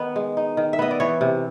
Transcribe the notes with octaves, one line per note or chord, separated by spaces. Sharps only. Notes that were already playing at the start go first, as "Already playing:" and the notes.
Already playing: D#3 B3 D#4
G#3
D#4
D#3
E5
B3 D#5
D5
E3 C#5
C3